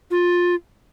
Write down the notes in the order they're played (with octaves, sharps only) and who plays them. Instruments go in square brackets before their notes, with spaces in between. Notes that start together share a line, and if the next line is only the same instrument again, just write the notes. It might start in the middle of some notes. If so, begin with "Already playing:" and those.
[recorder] F4